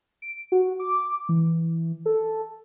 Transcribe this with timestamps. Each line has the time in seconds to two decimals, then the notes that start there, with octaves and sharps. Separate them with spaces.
0.22 D7
0.52 F#4
0.80 D6
1.29 E3
2.06 A4